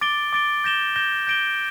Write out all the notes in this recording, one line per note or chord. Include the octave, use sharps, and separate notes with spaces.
D6 A6 D7 G7
D6 A6 D7 G7
G6 A#6 E7 G7
G6 A#6 E7 G7
G6 A#6 D7 G7